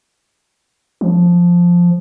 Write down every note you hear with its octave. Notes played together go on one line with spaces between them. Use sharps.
F3